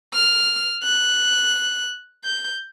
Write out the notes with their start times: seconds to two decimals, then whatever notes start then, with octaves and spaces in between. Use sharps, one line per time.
0.13 F6
0.84 F#6
2.24 G6